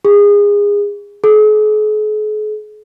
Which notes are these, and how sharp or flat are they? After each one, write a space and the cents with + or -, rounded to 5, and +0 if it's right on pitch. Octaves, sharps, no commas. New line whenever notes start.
G#4 -25
G#4 +45